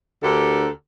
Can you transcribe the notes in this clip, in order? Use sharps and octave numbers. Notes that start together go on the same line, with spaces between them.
D2 D3 G4 A4 A#4